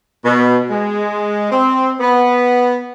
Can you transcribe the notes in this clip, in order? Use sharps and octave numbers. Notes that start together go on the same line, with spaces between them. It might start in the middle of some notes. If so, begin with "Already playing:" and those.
B2
G#3
C4
B3